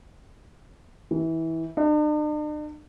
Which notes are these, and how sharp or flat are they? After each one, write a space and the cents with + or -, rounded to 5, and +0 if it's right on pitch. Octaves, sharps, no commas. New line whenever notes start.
E3 -20
D4 +45